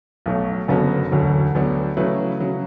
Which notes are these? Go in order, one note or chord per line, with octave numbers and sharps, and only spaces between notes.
B1 B2 F#3 A3
F#1 F#2 D3 F#3 B3
E1 D2 D3 F#3
D2 D3 F#3 B3 D4
C#3 F#3 A3 E4 B4
C#3 F#3